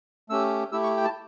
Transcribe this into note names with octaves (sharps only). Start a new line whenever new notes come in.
A3 C#4 G4 E6
A3 E4 G4 E6
C#6
G5
A5